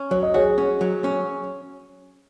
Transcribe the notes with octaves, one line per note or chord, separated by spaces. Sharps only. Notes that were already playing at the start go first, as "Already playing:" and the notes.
Already playing: C#4
F#3 C#5
D#5
F#4 G#4 C#5
C#4
F#3
C#4